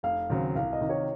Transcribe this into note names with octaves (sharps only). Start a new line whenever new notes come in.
F1 F5
D#2 C#3 F#3 C4
C2 F5
D#5
C3 D#3
C#5